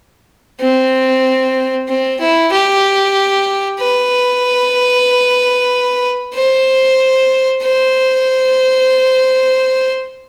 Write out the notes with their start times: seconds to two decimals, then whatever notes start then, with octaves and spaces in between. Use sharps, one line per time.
0.60 C4
1.88 C4
2.20 E4
2.52 G4
3.79 B4
6.35 C5
7.62 C5